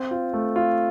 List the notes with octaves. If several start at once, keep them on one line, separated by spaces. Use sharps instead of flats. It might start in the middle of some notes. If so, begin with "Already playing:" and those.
Already playing: C4
F4
A3
F4